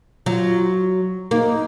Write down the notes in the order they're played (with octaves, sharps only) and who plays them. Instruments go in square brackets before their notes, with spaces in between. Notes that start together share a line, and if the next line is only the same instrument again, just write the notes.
[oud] F#3 [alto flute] F4
[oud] A#3 [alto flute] D#4